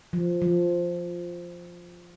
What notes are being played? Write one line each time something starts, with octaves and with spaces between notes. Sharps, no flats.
F3
F3